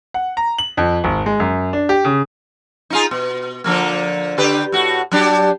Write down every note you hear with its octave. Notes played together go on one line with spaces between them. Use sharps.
F#5
A#5
F#7
F2
G#1
G#3
F#2
D4
G4
C#3
D#4 F4 G#4
B2
D3 F3 A#3
D3 G4 B4
A2 F#4
F#3 D4 G4